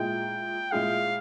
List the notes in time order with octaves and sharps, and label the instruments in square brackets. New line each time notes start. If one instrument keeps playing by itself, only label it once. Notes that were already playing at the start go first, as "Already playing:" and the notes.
Already playing: [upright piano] A#2 G#3 E4 G#4 [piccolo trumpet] G5
[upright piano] A#2 G#3 E4 G#4 [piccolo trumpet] F5